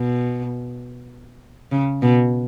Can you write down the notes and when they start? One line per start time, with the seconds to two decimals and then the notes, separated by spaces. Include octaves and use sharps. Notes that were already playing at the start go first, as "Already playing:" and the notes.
Already playing: B2
1.71 C#3
2.02 B2